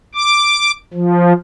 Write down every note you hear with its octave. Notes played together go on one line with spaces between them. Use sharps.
D6
F3